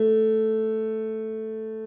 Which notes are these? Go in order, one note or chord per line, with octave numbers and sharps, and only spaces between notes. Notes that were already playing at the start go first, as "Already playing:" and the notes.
Already playing: A3